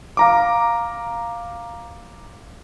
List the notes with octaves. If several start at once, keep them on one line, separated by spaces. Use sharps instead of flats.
F5 A#5 D6